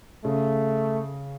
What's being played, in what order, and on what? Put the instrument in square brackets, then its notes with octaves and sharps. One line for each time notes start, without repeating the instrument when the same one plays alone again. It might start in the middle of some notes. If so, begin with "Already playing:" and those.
[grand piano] C#3 [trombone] A3